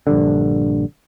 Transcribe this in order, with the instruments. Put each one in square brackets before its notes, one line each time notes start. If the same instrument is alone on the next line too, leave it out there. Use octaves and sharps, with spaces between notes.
[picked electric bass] A#1 G2 D3